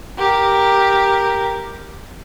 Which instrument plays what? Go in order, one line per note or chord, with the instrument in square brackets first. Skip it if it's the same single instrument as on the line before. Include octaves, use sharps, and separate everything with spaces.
[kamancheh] G4 A#4